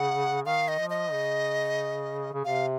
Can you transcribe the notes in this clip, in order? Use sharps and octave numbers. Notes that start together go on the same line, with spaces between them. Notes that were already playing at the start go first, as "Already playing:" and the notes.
Already playing: C#3 F#5
D#3 F5
D#5
F3
D#5
C#3
C#3
C3 F5